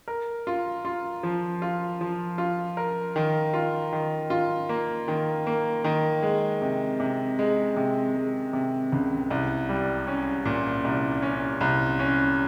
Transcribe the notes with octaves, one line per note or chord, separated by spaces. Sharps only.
A#4
F4
F4
F3
F4
F3
F4
A#4
D#3
F4
D#3
F4
A#3
D#3
A#3
D#3
G#3
C3
C3
G#3
C3
G#3
C3
C#2
C2
G3
C#4
A#2
C2
C#4
C2
C#4